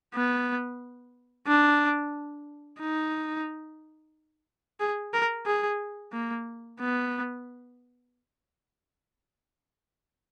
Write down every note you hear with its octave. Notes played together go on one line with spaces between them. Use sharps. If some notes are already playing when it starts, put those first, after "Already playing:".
B3
D4
D#4
G#4
A#4
G#4
A#3
B3